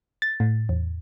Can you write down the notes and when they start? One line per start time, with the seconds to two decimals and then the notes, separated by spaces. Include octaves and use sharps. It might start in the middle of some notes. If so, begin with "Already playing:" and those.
0.22 A6
0.40 A2
0.69 E2